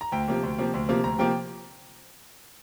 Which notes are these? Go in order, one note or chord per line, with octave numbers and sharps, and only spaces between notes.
A#5
D2 G5
C3 F3 A#3
D2
C3 F3 A#3
D2
C3 F3 A#3
D2 A#5
C3 F3 A#3 G5